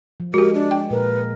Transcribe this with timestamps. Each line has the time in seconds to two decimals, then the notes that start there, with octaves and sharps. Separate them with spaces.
0.20 F3
0.34 G#3 F#4 G4 A#4
0.54 D4
0.71 G5
0.91 A#2 A#4 B4